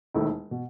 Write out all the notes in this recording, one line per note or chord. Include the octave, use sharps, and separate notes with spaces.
E1 D#2 D#3 A3 E4
B2